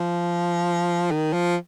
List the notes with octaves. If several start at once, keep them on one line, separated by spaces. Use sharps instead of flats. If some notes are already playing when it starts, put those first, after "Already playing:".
Already playing: F3
D#3
F3